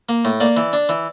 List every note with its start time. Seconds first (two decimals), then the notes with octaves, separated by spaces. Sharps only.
0.09 A#3
0.25 A2
0.40 A#3 D5
0.57 E3
0.73 D4
0.89 E3